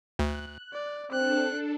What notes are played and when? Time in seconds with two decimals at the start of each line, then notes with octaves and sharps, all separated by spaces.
0.19 D2 F#6
0.73 D5
1.12 C4 D4 A4 F#6